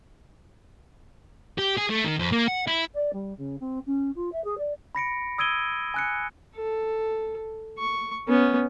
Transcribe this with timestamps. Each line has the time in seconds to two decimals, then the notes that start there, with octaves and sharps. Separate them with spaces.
1.59 G4
1.78 G#4
1.90 A3
2.05 D#3
2.19 F2
2.32 A#3
2.48 F#5
2.67 E4
2.94 D5
3.13 G3
3.37 C#3
3.60 C4
3.86 C#4
4.15 F4
4.32 E5
4.44 G#4
4.58 D5
4.95 B5 A#6 C#7 D7
5.38 D#6 E6 G#6 D7 D#7 G7
5.94 G#5 F#6 C#7
6.56 A4
7.78 C#6
8.28 B3 C#4